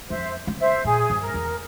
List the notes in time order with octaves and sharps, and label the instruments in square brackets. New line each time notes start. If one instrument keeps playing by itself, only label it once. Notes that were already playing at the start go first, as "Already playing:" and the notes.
[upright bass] F2 [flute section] C5 E5
[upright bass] C#3
[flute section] C5 E5
[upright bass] A#2 [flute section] G#4
[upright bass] G2
[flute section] A#4
[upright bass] E2